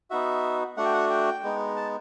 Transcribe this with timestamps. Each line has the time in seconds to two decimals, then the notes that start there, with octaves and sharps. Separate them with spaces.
0.11 B3 D#4 F#4 E5
0.77 A3 D4 F#4 F#5
0.85 G5
0.94 F#5
1.10 G5
1.43 G#3 B3 D#4
1.76 A5